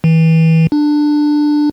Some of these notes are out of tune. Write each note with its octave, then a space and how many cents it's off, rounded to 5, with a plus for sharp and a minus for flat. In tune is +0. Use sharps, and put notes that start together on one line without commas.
E3 -30
D4 +15